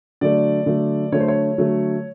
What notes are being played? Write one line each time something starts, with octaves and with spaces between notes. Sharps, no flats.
D3 F#3 A3 D5
D3 F#3 A3
D3 F#3 A3 C#5
C5
C#5
D3 F#3 A3